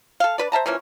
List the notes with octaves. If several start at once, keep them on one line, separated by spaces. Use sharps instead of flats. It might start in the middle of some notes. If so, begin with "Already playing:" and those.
A4 F5
D4 B4 D5
C5 E5 A5 A#5
E3 F3 A#3 C#4